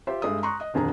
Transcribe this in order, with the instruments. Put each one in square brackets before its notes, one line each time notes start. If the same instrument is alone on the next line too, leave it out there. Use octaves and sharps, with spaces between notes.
[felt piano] F4 G4 C5 E5
G2 G#3 A4 E5 D#6
A#5 C6 C#6 D#6 F#6
D#5 D#6
D#1 F2 D3 G#4 A#5